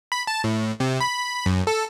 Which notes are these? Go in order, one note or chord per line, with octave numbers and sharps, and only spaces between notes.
B5
A5
A2
C3
B5
F#2
A4